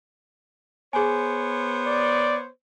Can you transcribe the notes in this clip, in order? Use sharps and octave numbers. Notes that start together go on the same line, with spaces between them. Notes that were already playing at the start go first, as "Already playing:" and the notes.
B3 G#4 C5 C#5 G#5
D5